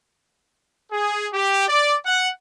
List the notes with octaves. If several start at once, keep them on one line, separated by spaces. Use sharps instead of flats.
G#4
G4
D5
F#5